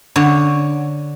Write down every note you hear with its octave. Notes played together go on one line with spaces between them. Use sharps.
D3 C#5